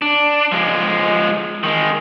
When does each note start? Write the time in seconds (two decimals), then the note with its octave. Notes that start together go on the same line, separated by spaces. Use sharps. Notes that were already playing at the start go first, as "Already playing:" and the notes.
0.02 D4
0.52 F3 G#3
1.63 D#3 G#3